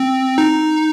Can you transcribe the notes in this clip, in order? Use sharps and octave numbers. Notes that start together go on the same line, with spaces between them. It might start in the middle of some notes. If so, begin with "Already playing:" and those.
Already playing: C4
D#4